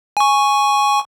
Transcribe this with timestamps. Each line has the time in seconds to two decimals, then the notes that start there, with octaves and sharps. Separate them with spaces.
0.17 G#5 C#6